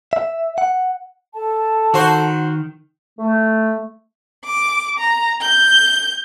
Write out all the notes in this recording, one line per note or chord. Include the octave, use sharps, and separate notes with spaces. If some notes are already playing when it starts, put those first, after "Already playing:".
E5
F#5
A4 A5
D#3 F#4 C5
A3
D6
A#5
G6